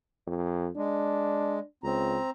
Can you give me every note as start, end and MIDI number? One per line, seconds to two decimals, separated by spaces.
0.27 0.69 41
0.77 1.59 56
0.77 1.63 62
1.84 2.17 37
1.84 2.30 60
1.84 2.30 82